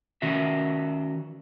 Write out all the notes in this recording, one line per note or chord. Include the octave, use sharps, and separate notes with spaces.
D#3 C#4 F#4 E5